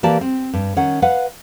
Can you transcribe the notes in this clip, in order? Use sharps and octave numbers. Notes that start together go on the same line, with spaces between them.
E3 A#3 G4 D5 A5
C4
G2
D#3 C#4 F#5
B4 F5 F#5